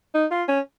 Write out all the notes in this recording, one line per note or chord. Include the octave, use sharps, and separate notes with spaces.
D#4
F4
C#4